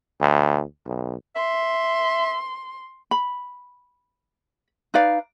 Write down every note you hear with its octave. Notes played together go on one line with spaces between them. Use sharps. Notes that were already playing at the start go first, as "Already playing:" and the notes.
D2
B1
E5 C6
B5
D#4 B4 D5 F5